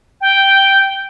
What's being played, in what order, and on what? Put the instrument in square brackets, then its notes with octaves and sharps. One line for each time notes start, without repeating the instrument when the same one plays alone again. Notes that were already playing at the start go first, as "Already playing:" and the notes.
[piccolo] G5